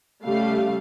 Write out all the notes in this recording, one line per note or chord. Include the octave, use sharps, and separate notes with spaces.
C#3 G3 A3 F5